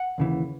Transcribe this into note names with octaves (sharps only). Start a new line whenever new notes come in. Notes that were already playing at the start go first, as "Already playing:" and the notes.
Already playing: F#5
D#2 C#3 E3